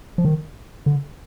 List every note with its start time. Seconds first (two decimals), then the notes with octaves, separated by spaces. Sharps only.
0.18 F3
0.25 D#3
0.86 D3